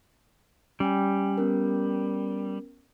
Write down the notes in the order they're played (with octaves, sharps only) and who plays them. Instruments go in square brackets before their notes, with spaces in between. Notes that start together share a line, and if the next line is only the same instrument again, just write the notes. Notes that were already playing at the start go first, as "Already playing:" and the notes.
[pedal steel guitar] G3 [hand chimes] C#4 G5 G#5
[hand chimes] B3 C#4 A#4